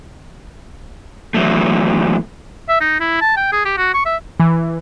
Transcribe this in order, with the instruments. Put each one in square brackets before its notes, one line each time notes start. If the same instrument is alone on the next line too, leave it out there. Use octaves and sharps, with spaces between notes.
[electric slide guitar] E2 F#3 A3
[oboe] E5
D#4
E4
A5
G5
G#4
G4
F#4
C#6
E5
[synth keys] E3